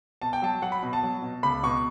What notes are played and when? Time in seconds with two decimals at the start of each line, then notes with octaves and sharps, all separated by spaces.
0.22 B2 A5
0.33 G5
0.42 F#3 A5
0.62 F#3 F#5
0.72 B5
0.83 B2
0.93 A5
1.03 F#3
1.22 B2
1.43 C#2 B5
1.63 B2 C#6